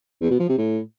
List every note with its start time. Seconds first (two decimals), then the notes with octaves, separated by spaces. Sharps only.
0.21 E2
0.31 B2
0.40 F3
0.49 C3
0.58 A2